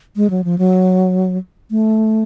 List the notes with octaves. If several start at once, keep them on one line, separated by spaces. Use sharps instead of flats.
G#3
F#3
F3
F#3
A3